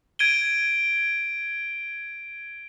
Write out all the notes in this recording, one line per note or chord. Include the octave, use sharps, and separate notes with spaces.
G#6 D7 D#7 G7